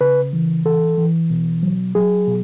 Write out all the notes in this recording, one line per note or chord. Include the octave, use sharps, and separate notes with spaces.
C#3 B4
E3
E3 A4
E3
B2
F#3
F#3 G#4
B2